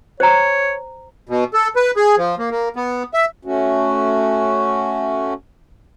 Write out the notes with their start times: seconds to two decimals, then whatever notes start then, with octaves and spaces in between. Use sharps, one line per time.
0.20 C5 C#5 A#5
1.29 B2
1.54 A4
1.76 B4
1.96 G#4
2.18 F3
2.39 A#3
2.51 A#3
2.76 B3
3.14 E5
3.45 A3 C#4 F#4